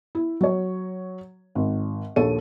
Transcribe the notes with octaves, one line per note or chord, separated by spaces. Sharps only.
E4
F#3 C#5
G#1
A#1 D#2 A#3 A4 C#5 D#7